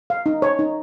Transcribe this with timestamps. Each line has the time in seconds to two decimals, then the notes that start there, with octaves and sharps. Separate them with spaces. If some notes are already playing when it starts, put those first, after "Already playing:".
0.10 F5
0.26 D#4
0.42 C#5
0.59 D#4